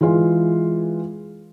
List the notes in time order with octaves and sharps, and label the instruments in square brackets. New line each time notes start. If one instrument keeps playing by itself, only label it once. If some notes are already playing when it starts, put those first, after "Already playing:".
[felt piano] E3 G#3 F4